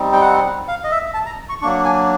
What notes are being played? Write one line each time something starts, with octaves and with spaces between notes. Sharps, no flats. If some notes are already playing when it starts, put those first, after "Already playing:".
Already playing: G3 C4 D#4
G5
F#5
F5
D#5
E5
A5
A#5
C#6
F#3 A#3 D4 C#6
G#5